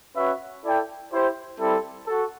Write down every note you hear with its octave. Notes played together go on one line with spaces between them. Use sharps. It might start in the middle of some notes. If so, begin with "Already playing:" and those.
C#4 F#4 B4 E5
E4 A4 D5 G5
E4 G4 C5
G3 C4 E4 A4
F#4 A4